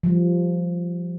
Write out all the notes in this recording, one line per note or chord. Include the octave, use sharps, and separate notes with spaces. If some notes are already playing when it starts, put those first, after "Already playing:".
F3 G3